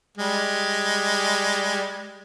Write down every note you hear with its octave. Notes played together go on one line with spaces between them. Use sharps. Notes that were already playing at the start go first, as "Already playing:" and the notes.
G3 G#3